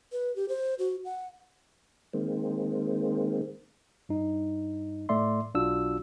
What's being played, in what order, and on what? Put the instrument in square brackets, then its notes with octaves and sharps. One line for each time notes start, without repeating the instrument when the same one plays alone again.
[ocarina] B4
G4
C5
F#4
F#5
[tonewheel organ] D#3 G#3 A#3 C4
[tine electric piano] G2 D#4
A2 A3 D5 E5 C6
B1 D4 F4 F#4 E6